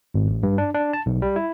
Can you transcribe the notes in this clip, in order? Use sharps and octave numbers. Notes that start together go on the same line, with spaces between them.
G#1
A1
G2
D4
D4
A5
B1
G3
E4